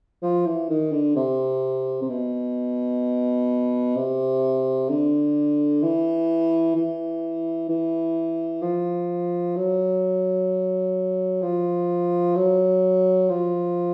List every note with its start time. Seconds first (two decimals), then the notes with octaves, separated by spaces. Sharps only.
0.22 F3
0.46 E3
0.69 D#3
0.92 D3
1.16 C3
2.02 C3
2.10 B2
3.96 C3
4.89 D3
5.83 E3
6.76 E3
7.69 E3
8.62 F3
9.56 F#3
11.42 F3
12.36 F#3
13.30 F3